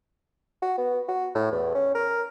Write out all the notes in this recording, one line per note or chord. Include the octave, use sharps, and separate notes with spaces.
F#4
B3
F#4
A2
E2
C#4
A#4